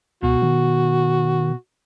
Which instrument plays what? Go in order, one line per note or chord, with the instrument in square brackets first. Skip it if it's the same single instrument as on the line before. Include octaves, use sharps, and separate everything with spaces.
[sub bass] C#2 [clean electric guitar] B2 [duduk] F#4
[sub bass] D#3